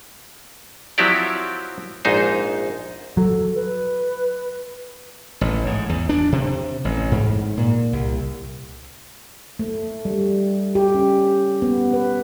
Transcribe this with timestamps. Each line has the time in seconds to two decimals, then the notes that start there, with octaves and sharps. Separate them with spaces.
0.98 F3 F#3 C4 E4 G4 D5
2.05 A#1 G#2 D#4 C5
3.17 F#3 A4
3.55 B4
5.41 A1
5.66 G#2
5.89 E2
6.09 D4
6.32 C3
6.85 A1
7.11 G#2
7.57 A#2
7.93 C2
9.59 A3
10.05 G3
10.75 G4
10.94 C#4
11.62 B3
11.94 B4